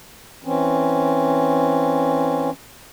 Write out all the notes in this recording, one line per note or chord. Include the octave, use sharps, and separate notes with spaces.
E3 C4 C#4